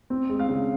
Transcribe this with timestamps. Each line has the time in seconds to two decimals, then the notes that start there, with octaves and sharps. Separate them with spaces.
0.10 C4
0.30 G#3
0.39 F5
0.49 C#3